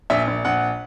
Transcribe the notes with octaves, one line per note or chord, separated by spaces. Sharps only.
A#1 E5
A#1
A#1 F#5